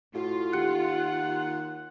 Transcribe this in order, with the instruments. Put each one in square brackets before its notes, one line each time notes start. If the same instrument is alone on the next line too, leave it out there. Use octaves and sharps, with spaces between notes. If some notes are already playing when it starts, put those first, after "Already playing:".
[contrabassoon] A2 [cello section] F4 [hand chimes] F#4
[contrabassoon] D#2 [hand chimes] G4 F#6 C#7 [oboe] F#5